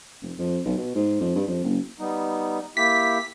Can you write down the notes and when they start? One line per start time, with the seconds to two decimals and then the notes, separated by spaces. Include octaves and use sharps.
0.22 F1
0.38 F2
0.65 B1
0.78 B2
0.95 G#2
1.20 F2
1.35 G2
1.48 F2
1.64 F#1
1.99 G3 B3 D#4
2.77 A#3 E4 G4 B6